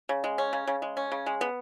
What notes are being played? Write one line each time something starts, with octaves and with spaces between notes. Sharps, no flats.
C#3
G#3
C#4
C#3
C#3
G#3
C#4
C#3
G#3
B3